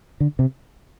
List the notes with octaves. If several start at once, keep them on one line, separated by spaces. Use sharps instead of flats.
D3
C3